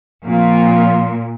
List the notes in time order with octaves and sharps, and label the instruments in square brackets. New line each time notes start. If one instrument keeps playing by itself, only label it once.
[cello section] A#2 [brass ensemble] F3 C4 F4